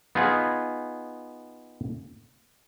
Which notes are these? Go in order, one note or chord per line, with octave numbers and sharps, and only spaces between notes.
B3 D#4 F4 G#4